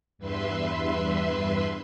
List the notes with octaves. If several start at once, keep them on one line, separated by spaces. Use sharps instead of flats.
E2 G2 B4 E5 C6